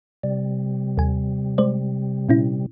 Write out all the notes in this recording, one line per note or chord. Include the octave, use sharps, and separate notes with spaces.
C3 G3
D#2 G#5
G#3 C5 D5
A#2 C#4 E4